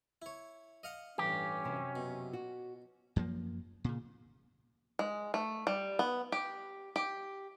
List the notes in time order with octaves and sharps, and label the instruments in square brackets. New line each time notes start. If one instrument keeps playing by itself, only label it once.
[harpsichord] E4 C#5
D#5 F5 F#5
[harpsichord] A1 G2 [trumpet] C#4 [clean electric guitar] G4
[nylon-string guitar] F#2 C3 F#3
[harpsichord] B2
[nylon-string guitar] F#4
[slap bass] F#2 F3 A#3
A#2 C#3
[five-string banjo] G#3
A3
G3
B3
G4
G4